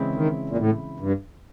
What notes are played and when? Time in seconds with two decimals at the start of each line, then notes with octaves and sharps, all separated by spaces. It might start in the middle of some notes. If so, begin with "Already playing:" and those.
Already playing: C#3 E3 G#3 C4 E4
0.15 D#3
0.50 A#2
0.58 A2
1.00 G2